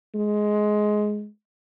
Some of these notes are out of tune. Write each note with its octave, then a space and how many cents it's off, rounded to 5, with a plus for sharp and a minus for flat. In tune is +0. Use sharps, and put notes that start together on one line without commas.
G#3 +15